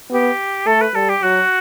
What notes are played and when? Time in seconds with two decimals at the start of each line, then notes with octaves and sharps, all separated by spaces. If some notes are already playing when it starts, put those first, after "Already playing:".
0.10 B3 G4
0.66 A3 A4
0.81 B4
0.94 G3 A4
1.09 G4
1.22 F#3 F#4